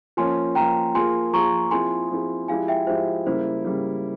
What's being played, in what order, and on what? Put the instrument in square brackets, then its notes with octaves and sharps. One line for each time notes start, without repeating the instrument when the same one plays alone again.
[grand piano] F3 A#3 C#4 [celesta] G#5 C6
[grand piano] F3 A#3 C#4 [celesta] G5 A#5
[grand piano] F3 A#3 F4 G#4 [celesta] G#5 C6
[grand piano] F3 A#3 F4 G#4 [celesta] A#5 C#6
[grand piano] F3 C4 E4 G#4 [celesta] G#5 C6
[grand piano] F3 C4 E4 G#4
[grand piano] F3 G#3 E4 G4 [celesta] F5 G#5
[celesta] E5 G5
[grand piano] F3 G#3 E4 G4 [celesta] C5 E5
[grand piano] C#3 G3 A#3 E4 [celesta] C5
[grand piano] C#3 G3 A#3 E4